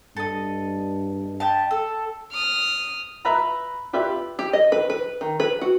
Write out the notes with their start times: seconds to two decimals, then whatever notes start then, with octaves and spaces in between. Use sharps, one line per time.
0.16 G2 A4 D#5
1.40 G4 D#5 A5
1.71 A4
2.32 D#6 F6
3.25 B4 E5 A#5 B5
3.93 F4 G4 B4 E5
4.39 G4
4.53 D#5
4.72 B4
4.90 B4
5.21 D#3
5.40 B4
5.61 F#4